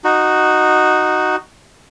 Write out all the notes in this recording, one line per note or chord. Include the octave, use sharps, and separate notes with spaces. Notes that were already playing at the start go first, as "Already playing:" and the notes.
D#4 F#4